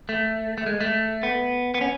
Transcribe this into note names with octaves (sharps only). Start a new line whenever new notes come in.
A3
A3
G#3
A3
B3
B3
C#4